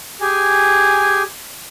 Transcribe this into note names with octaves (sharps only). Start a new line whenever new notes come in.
G4 G#4 G#5